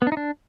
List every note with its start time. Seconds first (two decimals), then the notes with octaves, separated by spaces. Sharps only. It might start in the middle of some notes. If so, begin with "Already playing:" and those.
0.02 B3
0.07 D4
0.12 D#4
0.17 D4